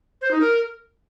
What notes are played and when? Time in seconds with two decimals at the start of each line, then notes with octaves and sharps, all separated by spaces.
0.21 C5
0.31 D#4
0.41 A#4